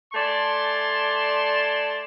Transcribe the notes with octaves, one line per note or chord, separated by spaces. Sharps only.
A3 D5 G#5 A5 C6